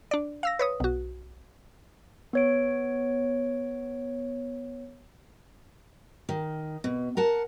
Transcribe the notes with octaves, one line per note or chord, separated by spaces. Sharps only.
D4 D5
F5 E6 A#6
B4 C#5 D#6
B1 F#4
B3 C#5 D7
D#3
B2
A#4 F#5 A5